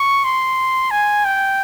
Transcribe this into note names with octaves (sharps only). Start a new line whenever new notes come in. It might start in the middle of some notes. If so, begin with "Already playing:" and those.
Already playing: C#6
C6
G#5
G5